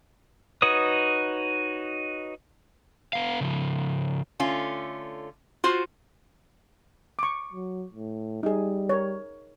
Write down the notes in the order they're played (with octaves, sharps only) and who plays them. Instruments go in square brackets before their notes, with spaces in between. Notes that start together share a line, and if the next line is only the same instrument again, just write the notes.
[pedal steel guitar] D#4 F#4 B4 C#5 D#6
[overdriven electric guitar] B3 F5
C#3 F3
[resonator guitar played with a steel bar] D3 A3 C#4 F4
F4 F#4 C5
[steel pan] C#6 D6
[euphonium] F#3
A2
[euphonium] G3 [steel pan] D#4 G#4
[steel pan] A#4 C#5